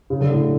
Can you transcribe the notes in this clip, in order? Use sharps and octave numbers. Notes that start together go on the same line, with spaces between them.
C#3
D3
A2 C#3